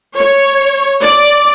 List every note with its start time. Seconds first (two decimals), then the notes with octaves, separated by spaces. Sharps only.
0.17 C#5
1.02 D5